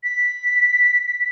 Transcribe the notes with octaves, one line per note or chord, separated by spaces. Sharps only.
B6